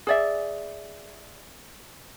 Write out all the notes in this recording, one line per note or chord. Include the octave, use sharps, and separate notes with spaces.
G#4 D5 E5